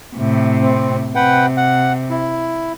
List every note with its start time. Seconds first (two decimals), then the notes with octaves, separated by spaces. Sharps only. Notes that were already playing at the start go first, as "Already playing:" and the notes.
0.17 A2 C3
0.61 C4
1.15 C3 B4 F#5 G5
1.57 F#5
2.10 E4